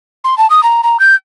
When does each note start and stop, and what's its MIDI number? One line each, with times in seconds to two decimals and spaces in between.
0.24 0.37 84
0.38 0.48 81
0.50 0.63 87
0.63 0.81 82
0.83 0.99 82
1.00 1.15 91